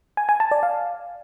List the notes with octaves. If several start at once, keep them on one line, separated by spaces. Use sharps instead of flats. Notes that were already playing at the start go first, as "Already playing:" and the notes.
G#5
G#5
A5
D5
F5